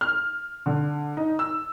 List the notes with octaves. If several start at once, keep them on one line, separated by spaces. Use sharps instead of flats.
F6
D3
D#4
E6